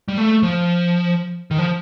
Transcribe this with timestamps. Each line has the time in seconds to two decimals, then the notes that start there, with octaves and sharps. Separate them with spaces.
0.08 G3
0.17 A3
0.43 F3
1.51 D#3
1.59 F3